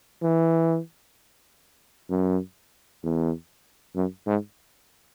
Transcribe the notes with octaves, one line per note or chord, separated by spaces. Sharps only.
E3
F#2
E2
F#2
G#2